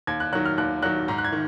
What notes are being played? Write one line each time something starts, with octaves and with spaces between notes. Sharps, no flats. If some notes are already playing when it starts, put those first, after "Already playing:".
D#2 G#6
F#6
D#3 F#3 F#6
F6
D#2 F#6
D#3 F#3 F#6
G#2 A#5
F#6
G#6
D#3